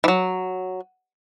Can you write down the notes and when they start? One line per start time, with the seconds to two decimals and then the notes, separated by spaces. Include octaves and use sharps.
0.04 E3 F#3